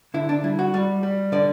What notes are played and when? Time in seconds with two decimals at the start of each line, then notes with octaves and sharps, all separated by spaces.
0.14 D3 E4
0.29 D4
0.43 G3 E4
0.59 F#4
0.74 G3
1.03 G3
1.32 D3 D5